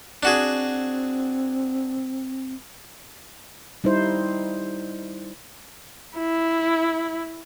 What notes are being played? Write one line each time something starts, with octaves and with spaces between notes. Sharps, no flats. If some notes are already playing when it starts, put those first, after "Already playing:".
C4 D4 F#4 G#4
G3 D#4 E4 C5
E4